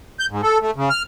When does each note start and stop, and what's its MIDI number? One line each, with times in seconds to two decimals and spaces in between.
0.19 0.26 91
0.31 0.41 44
0.43 0.58 69
0.61 0.71 57
0.76 0.89 49
0.90 1.03 89